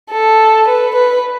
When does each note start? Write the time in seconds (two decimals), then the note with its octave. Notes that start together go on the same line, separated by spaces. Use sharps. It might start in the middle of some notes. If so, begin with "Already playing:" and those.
0.11 A4
0.67 B4
0.95 B4